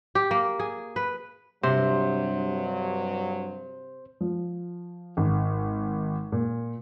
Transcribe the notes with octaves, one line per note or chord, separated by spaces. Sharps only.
G4
A#3
G#4
B4
G2 C3 F#3 C5
F3
G#1
A#2